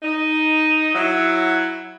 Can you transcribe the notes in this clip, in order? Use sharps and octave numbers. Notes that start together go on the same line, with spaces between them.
D#4
F#3 E4